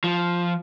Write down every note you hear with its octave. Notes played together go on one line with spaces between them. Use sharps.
F3